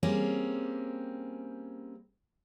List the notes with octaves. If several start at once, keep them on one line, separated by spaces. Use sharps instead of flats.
G3 A#3 C4 C#4 G#4